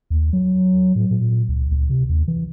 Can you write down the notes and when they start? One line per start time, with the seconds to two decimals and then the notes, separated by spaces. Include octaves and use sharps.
0.10 D#2
0.33 F#3
0.96 A2
1.11 A#2
1.49 C#2
1.71 C#2
1.90 C3
2.09 D#2
2.28 E3